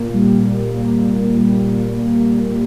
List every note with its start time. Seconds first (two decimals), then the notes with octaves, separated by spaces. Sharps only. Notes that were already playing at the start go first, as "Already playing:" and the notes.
Already playing: A#2 A#3
0.14 G3
0.45 A#2
0.75 A#3
1.06 A#2
1.38 G3
1.68 A#2
1.99 A#3
2.29 A#2